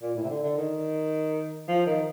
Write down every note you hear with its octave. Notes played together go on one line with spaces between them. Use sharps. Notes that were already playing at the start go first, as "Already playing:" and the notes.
A#2
A2
C3
D3
D3
D#3
F3
D#3